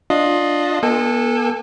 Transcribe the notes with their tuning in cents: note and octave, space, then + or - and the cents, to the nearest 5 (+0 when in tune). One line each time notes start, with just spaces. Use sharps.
D4 +0 F4 +15 D#5 +0
B3 -40 A4 +0 G#5 -35